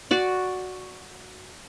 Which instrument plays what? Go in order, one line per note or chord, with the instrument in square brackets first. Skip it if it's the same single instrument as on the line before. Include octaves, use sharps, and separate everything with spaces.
[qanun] F#4 D5